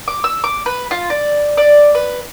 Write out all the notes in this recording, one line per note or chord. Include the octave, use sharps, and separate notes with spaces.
D6
E6
D6
B4
F4
D5
D5
B4